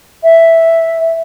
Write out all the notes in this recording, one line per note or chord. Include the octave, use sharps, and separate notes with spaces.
E5